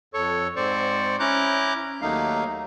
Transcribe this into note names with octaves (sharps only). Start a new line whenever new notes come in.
F2 A4 C#5 C#6
G#2 C4 C5 D5 C#6
C#4 E4 A#5 D6 F#6 G6
D#2 F#3 A3 A#3 D#4 F5